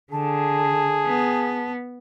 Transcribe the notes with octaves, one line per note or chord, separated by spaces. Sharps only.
D3 G#4 A5
B3